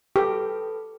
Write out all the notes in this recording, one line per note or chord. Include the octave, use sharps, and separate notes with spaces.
G4 A4 B4